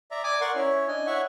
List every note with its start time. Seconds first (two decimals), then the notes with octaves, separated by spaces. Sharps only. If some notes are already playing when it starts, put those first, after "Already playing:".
0.11 D5 E5 A#5
0.23 D5 G#5 D6 D#6
0.41 A#4 D5 F#5 C6 C#6
0.55 C#4 E4 C#5
0.88 D4 D#5 G#5
1.07 E4 C#5 E5 F#5 C#6